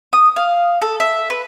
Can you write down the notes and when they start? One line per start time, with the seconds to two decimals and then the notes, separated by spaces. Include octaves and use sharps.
0.13 D#6
0.36 F5
0.82 A4
1.00 E5
1.30 B4